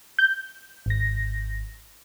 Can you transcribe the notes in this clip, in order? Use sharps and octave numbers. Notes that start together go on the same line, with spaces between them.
G6
G#1 A#6